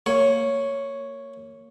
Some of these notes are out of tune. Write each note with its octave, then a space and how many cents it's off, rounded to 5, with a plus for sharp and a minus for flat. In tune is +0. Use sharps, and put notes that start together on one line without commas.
A#3 -20 C#5 +0